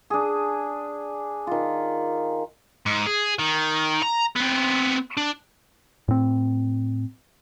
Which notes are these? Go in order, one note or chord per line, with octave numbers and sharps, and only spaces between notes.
D4 G#4
D#3 F4
G#2
G#4
D#3
A#5
B3 C4
D4
A2 C4